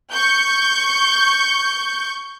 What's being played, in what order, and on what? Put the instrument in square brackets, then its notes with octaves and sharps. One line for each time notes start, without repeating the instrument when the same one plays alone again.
[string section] C#6 G6